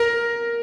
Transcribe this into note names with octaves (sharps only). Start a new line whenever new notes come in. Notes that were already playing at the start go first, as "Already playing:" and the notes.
Already playing: A#4